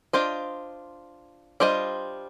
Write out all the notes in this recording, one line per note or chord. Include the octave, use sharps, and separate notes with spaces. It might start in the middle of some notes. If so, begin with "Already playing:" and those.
D4 F4 C5 D#5
G3 D4 F4 C5 D#5